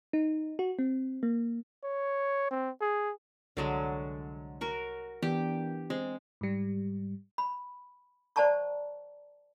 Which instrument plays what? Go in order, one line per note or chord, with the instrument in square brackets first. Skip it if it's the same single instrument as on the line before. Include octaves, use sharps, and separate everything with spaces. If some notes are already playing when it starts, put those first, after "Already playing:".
[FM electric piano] D#4
F#4
C4
A#3
[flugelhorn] C#5
C4
G#4
[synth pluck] C2 [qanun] D3 F#3 G#3
[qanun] F#4 A#4 C#6
[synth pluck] E3 B3 D4 [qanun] G4
[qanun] G#3 [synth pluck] C4
[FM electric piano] G#2 G3
[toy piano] B5
C5 D5 F#5 A5 A#5 C#6